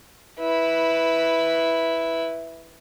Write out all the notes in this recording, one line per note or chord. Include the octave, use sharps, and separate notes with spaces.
E4 B4